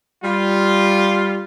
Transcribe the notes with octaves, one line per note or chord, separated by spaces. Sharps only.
G3 F4